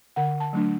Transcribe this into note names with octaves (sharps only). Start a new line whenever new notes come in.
D3 F#5
A5
F#3 A3 D4